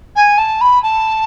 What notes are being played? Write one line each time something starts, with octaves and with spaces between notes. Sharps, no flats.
G#5
A5
B5
A5